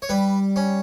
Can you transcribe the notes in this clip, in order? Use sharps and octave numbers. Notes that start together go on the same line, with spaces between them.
C#5
G3 B4
C#4